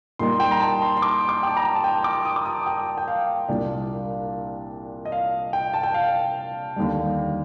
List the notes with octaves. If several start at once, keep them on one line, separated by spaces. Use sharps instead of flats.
A#2 G3 A#3 D#4 C6
G5
A#5
A5
C6
C6
D6
D6
G5
A5
A#5
A5
G5
D6
D#6
D6
D#6
G5
G5
F5
C2 A#2 G3 D4
D#5
F5
G5
A5
G5
F5
D#2 D3 G3